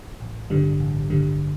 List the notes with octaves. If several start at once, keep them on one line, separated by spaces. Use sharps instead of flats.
A1
G2 D3 G3
A1
G2 D3 G3